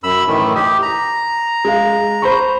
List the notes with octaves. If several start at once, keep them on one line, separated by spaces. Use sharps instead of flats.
F#2 B5 E6
A2 D#3 E3
G4 D#6
A#5
G#3 F5
C5 B5 C#6